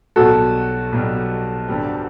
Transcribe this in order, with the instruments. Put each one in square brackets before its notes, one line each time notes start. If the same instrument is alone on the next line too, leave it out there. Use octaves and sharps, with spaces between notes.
[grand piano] B1 B2 G3 [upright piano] F#4 A4
[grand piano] B1 B2 G3
G1 G2 D3 G3 C4